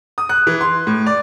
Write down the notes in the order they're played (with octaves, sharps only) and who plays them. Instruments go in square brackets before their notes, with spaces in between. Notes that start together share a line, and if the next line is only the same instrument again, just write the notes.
[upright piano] D#6
F#6
E3
C6
A2
D5